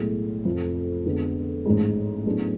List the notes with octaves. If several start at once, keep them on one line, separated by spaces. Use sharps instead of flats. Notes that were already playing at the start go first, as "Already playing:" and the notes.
Already playing: B1 A2 G#3
F1 F2 F3 A3 F4
F2 D3 G#3 B3
A1 G#2 G#3
A2 F#3 B3 D4 G#4